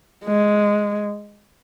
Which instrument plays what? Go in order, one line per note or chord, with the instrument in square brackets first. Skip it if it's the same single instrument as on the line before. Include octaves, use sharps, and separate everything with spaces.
[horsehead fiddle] G#3